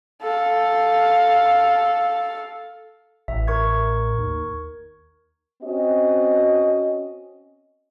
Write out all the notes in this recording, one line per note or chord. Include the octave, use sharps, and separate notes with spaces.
A4 F5
A1 E5
A#4 C#6 G#6
D#2
C4 C#4 F#4 D#5